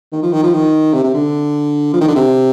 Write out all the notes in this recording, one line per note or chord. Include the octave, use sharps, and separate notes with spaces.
D#3
F3
D#3
F3
D#3
C3
C3
D3
F3
D#3
D3
C3